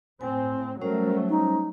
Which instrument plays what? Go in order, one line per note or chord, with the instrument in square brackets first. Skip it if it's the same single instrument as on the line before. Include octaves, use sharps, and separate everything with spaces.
[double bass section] A2 C4 [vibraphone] G#5
[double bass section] F#3 A3 [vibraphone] G3 C#4 C5 [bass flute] A#4
[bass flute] D#4